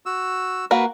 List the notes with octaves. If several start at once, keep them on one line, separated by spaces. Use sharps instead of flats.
F#4 E6
A#3 F#4 B4